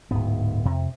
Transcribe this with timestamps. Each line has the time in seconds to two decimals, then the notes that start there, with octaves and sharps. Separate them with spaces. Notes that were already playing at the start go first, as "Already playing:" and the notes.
0.11 D1 G#2 B3
0.65 F2 C3